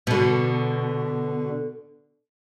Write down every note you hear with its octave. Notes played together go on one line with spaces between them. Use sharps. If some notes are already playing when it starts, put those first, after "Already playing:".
B2 D3